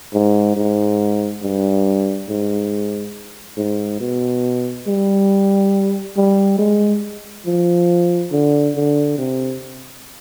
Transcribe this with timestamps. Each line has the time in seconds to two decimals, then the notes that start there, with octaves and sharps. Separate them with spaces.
0.14 G#2
0.56 G#2
1.43 G2
2.29 G#2
3.57 G#2
4.00 B2
4.87 G3
6.16 G3
6.59 G#3
7.46 F3
8.32 D3
8.75 D3
9.18 C3